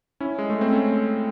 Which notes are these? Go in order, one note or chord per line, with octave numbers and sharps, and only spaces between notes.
C#4 E4
G#3
A3
C4
A3 C#4